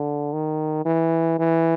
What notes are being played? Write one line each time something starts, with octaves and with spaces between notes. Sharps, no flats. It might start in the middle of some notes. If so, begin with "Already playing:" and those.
Already playing: D3
D#3
E3
E3